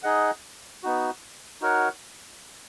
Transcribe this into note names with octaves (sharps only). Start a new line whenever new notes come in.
D#4 G#4 D#5 F#5
B3 D#4 F#4
D#4 F#4 A#4 C#5 F#5